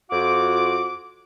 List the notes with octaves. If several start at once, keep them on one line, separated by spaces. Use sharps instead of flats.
F2 F4 F#4 F#5 D6